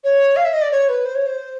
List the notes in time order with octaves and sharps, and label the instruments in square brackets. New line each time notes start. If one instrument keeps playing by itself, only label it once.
[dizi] C#5
F5
E5
D#5
D5
C#5
B4
C5
C#5
C5